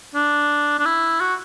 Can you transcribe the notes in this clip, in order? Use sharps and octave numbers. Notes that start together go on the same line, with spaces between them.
D4
D4
E4
F#4